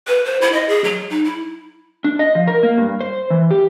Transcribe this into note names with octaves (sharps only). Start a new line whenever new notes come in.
B4
C5
E4
D#5
G#4
F#3
D#4
E4
D4
D#5
F3
A#4
A#3
G2
C5
E3
G4